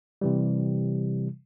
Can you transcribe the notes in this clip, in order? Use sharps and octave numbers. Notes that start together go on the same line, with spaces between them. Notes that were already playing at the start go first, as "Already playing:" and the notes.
C3 E3 G3